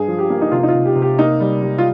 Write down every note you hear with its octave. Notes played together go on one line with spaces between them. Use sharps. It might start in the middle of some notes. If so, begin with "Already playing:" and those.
Already playing: G2 G#4
F3
G4
A#3
D#4
C3 F4
D#4
F4
C3
G4
C3
G4
A#3 D#4
G3
G3
F4